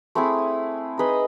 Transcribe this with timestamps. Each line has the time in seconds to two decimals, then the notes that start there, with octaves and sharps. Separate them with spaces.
0.15 A3 C4 E4 G#4
0.98 D#4 G#4 B4 D#5